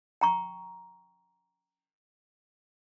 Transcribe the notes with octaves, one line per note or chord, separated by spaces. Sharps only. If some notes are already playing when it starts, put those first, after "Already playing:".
G5 A#5 C#6